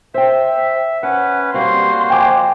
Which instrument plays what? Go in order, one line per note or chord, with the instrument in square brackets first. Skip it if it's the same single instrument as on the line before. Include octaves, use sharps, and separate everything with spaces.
[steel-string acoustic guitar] C5 G5 [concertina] E5
[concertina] C#4 B4 [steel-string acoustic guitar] F#5
[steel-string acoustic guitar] G3 C4 [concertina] A#3 F#4 C5 [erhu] C6
[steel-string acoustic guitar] F2 [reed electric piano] G5 G#5 D6